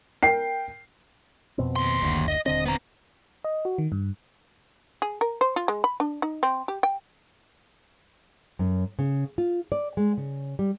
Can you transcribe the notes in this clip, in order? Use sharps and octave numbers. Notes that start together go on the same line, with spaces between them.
A#4 G5 C7
F2 B2 C4
D#2 C6
F#1 D2
D#5
D#1 D3 C4 D#5
B3 A#5
D#5
F#4
D#3
G2
G#4
A#4
C5
F4
G#3
B5
D4
D#4
C4
G4
G5
F#2
C#3
F4
D5
G#3
C#3
G3